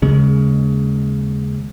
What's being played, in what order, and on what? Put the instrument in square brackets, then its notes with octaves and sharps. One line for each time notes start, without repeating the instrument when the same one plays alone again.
[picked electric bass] D#2 C#3 G#3 C#4